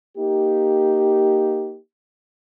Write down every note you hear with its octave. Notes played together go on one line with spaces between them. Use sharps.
A#3 D#4 G4